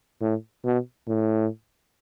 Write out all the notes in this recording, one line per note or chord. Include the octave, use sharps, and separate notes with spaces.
A2
B2
A2